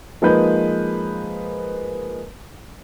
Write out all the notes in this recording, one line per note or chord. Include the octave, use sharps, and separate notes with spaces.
F3 G#3 A#3 D#4 B4 G6